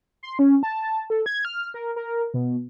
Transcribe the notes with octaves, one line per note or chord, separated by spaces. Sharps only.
C6
C#4
A5
A4
G#6
F6
A#4
A#4
B2